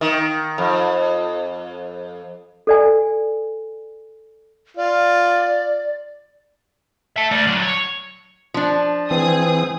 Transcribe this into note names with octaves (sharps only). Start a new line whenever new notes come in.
D#3
F2
A4 D5 G#5
F4 D5
E5 A5
A3 D5
D3 F#3
C#5
F3 D4
E3 C4 G#4 G#5 D#6